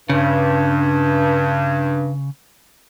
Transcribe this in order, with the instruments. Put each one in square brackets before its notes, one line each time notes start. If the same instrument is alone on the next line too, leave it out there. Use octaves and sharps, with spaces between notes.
[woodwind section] G2 [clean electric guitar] C#3